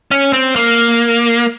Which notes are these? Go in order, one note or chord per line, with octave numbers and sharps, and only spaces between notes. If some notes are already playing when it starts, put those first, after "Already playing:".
C#4
C4
A#3